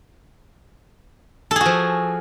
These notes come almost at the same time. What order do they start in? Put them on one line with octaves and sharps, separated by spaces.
A4 G#4 F#4 F3